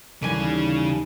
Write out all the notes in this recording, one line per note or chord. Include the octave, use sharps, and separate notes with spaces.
D#2 C#3 E3 G3 A4 G#5